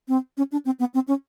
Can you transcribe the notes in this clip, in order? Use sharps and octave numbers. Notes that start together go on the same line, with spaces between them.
C4
C#4
D4
C4
B3
C4
C#4